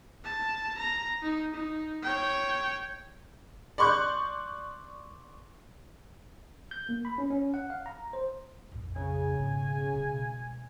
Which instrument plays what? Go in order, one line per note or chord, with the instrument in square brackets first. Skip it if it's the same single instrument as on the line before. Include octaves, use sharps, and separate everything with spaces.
[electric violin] A5
A#5
D#4
D#4
C#5 G5
[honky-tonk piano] D5 C6 C#6 F#6 G6
[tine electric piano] G6
A#3
B5
C#4
C#4
F#5
F5
A#5
C5
[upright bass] A#1 F2
[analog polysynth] C#3 [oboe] G#5
[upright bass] G#1 B2
B2 G#3